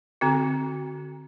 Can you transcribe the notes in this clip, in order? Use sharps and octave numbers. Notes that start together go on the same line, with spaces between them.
D3 C4 F#4